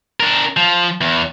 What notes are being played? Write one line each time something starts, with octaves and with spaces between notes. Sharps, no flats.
D4 A#4
F3
E2